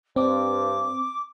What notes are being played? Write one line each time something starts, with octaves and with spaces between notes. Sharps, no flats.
G2 C4 D6